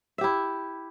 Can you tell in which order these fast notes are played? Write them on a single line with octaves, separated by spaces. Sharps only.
E5 G4 E4